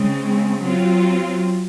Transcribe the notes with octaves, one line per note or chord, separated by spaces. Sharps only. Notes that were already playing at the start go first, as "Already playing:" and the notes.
Already playing: C#3 G#3 C4
F#3 C4 F4